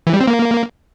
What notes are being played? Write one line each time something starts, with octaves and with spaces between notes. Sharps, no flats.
E3
G3
C4
A#3